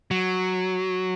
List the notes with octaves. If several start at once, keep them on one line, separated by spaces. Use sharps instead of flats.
F#3